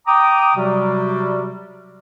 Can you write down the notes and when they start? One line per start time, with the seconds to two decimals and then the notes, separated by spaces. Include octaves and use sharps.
0.07 G5 A#5 D6 D#6
0.56 C3 F#3 G3 F#4